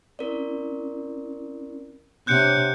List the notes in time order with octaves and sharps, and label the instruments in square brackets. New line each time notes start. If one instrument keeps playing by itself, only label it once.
[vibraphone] C4 C#4 E4 [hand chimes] A#4 D5
[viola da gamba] C3 [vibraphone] D4 C#5 F#5 [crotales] F#6 G6 C#7